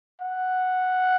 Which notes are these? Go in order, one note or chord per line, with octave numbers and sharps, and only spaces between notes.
F#5